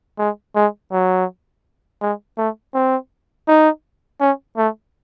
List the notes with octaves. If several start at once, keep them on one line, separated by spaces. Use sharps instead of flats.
G#3
G#3
F#3
G#3
A3
C4
D#4
C#4
A3